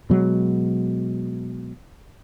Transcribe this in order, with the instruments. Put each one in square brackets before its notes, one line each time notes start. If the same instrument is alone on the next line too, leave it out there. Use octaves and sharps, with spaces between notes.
[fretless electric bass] B2 F#3 G#3